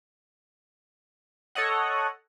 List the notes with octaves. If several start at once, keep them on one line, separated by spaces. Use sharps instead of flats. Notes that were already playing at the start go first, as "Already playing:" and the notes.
A4 C#5 D#5 F#5